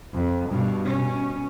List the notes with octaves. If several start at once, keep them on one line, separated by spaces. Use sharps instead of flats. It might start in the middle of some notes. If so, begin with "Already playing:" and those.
F2
G2 B2
B2 C#4